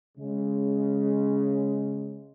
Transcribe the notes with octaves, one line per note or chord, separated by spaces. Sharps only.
C#3 G#3